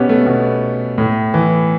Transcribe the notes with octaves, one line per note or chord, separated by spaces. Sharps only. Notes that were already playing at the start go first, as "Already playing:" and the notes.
Already playing: B2 B3 C#4 G4
A3
B2
A2
E3